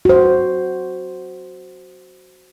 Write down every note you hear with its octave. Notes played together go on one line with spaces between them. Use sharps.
F#4 C5